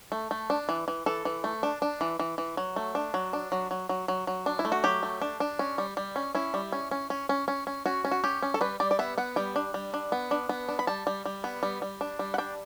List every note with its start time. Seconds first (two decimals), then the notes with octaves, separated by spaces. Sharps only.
0.12 A3
0.31 A3
0.50 D4
0.69 E3
0.88 E3
1.06 E3 A4
1.25 E3
1.44 A3
1.63 D4
1.82 D4
2.01 E3
2.19 E3
2.38 E3
2.57 F#3
2.76 A3
2.95 D4
3.14 F#3
3.33 D4
3.52 F#3
3.71 F#3
3.89 F#3
4.08 F#3
4.27 F#3
4.46 D4
4.59 E4
4.65 A3
4.72 F#4
4.84 F#3 G4
5.03 A3
5.22 D4
5.40 D4
5.59 C#4
5.78 G3
5.97 G3
6.16 C#4
6.35 C#4 E4
6.54 G3
6.72 C#4
6.91 C#4
7.10 C#4
7.29 C#4
7.48 C#4
7.67 C#4
7.86 C#4 F#4
8.05 C#4
8.11 F#4
8.24 C#4 G4
8.42 C#4
8.54 A4
8.61 G3 B4
8.80 G3 D5
8.91 D5
8.99 B3 E5
9.18 B3 F#5
9.36 G3 G5
9.56 D4
9.74 G3
9.94 D4
10.12 B3
10.31 D4
10.49 B3
10.69 D4
10.79 B5
10.87 G3 A5
11.07 G3
11.26 G3
11.44 B3
11.63 G3
11.82 G3
12.01 D4
12.19 G3
12.34 F#5
12.38 D4 G5